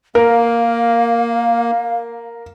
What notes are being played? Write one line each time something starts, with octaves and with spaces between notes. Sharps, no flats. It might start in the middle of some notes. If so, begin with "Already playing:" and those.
A#3 A#4 F5